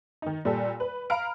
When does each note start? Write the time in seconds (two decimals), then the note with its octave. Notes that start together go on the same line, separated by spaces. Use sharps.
0.22 D#3 D#4
0.45 A#2 G3 A4
0.80 B4
1.10 F5 A#5 B5 F6 D7